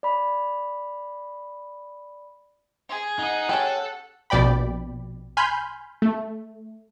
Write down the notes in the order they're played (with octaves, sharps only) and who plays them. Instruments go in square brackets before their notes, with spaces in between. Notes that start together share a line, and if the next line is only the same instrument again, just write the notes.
[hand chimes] D5 B5
[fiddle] G#4
[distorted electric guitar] D#4 D#5 [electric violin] F#5
[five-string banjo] C#4 G4 [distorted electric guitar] A4
[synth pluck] A#1 B2 D5 G5 B5
G#5 B5 C6 F6 G6
A3